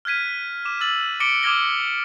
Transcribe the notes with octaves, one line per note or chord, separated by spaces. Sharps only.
F6 F#6 G#6 B6 D#7
D6 E7
E6 A6 F#7
D6 A#6 C#7 D7 E7 G7
D6 D#6 F6 G#6 A#6 G7